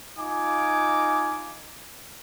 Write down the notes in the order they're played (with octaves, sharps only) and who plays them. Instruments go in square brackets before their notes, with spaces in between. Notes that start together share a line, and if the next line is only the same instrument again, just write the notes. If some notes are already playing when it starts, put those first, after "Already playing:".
[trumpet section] D#4 F4 G#5 D6